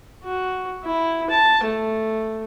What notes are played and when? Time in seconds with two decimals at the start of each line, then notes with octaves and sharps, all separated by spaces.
0.24 F#4
0.83 E4
1.30 A5
1.64 A3